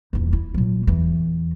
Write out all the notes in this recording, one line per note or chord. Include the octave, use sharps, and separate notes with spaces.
D#1 E2
E4
A#2 F#3
E2 E3